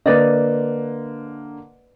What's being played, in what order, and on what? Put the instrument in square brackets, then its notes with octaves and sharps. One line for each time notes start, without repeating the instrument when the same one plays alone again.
[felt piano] D3 A#3 [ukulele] B4 D5 D#5